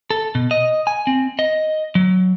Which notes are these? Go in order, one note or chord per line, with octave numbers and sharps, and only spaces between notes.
A4
B2
D#5
G#5
C4
D#5
F#3